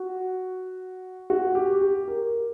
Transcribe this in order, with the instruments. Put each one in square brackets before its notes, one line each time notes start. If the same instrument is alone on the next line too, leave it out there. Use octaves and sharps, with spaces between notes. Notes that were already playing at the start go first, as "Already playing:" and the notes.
Already playing: [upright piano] F#4
F#4
G4
G4
A#4